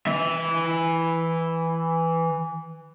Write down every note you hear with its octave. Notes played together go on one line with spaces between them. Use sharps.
E3 E5